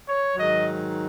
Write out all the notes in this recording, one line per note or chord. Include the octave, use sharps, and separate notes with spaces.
C#5
G#2 D#3 F#3 D#5